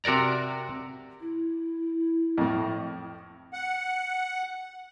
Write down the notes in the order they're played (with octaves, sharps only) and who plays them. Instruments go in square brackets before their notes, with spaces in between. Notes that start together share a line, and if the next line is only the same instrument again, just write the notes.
[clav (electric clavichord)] C3 F#4 A#4 D5 A#5
[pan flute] E4
[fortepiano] F2 A2
[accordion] F#5